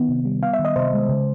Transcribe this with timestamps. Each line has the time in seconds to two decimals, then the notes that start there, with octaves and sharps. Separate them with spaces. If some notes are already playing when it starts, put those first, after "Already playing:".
Already playing: D#3 B3
0.09 C3
0.25 G3
0.43 B3 F5
0.53 E5
0.59 D#3
0.65 D#5
0.76 C3 C5
0.93 G#3
1.09 C#3